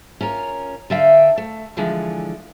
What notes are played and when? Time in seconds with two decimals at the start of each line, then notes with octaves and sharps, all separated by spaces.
0.21 C#4 F4 A#4
0.90 D3 D5 E5 F5 G5
1.37 A3
1.77 D3 E3 F3 G#3